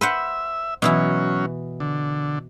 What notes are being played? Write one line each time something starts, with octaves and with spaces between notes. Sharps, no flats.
B4 C5 E5 F#5
B2 E3 F#3 C#4 E4
D3